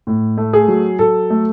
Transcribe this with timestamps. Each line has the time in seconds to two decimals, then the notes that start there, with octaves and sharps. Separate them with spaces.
0.07 A2
0.37 A3
0.53 G#4
0.68 F#3
0.99 F#3 A4
1.30 A3